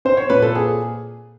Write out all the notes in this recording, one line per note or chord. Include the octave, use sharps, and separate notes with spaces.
C4 C5
C#5
A#2 B4
A4
G#4